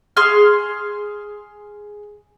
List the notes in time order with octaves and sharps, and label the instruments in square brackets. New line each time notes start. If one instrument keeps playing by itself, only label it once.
[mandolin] G#4 C6 F6